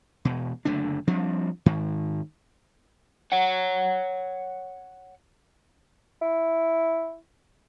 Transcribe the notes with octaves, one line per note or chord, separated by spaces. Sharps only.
E1 B2
F#1 D3 A3 D4
F3 G3 C4 D4
G#2 D#3
C#5 F#5
E4